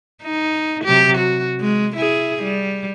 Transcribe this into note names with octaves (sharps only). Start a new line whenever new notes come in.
D#4
C3 F#3 G4
F#4
G#3
E4 G#4
G3